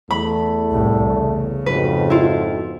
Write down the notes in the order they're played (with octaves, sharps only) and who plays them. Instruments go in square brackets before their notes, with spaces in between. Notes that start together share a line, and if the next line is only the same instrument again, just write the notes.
[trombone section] E2 A3 [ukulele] B5
[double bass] C2 A2
C#3
[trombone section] F2 G#2 B2 [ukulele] B4
[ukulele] E4 F4